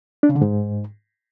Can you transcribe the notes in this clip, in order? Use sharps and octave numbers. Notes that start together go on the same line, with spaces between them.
D4
C#3
D3
G#2